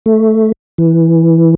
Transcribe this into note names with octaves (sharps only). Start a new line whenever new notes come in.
A3
E3